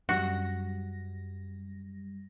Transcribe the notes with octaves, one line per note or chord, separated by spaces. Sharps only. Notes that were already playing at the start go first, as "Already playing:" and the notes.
F#2 G3 F#4 A#6